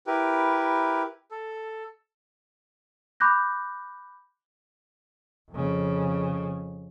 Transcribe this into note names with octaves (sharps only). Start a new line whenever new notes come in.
E4 G4 A#4 B4
A4
B5 D6 F#6 G6 A#6
F2 C#3